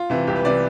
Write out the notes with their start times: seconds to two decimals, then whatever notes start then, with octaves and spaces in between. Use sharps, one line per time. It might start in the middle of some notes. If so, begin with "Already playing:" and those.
Already playing: F4
0.10 C3 E3
0.27 C2 G4
0.36 B4
0.45 C3 E3 D5